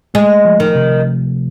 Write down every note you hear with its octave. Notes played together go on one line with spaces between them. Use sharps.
G#3 A3
F3
D#3
C3